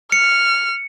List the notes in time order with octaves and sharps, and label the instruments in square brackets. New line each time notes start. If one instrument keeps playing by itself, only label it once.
[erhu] F6 [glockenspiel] C#7